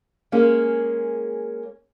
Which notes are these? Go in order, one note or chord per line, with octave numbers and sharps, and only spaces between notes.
G#3 A#3 C#4 G#4